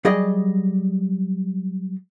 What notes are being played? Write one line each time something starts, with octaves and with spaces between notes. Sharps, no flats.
F#3 G3 G#4 D5 D#5